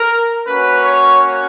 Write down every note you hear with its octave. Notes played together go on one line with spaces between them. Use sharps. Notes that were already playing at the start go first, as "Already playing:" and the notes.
Already playing: A#4
A#3 C#4 F#4 B4
C#5